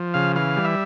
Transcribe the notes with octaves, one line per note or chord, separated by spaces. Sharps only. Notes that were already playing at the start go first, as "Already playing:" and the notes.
Already playing: F3
C#3 F5
E3 F5
G3
E5